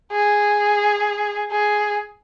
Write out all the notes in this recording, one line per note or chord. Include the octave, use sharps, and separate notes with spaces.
G#4
G#4